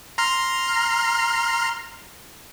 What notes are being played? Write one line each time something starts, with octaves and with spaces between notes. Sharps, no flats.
A#5 C6 F6